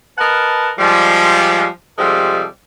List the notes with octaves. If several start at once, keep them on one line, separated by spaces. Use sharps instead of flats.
A#4 B4 D#5 F#5 A5
F3 G3 G#3
C3 F3 G3 G#3 A4